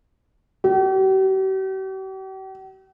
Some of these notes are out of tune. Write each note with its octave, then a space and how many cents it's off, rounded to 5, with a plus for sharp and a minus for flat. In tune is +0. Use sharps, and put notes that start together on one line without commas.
G4 -45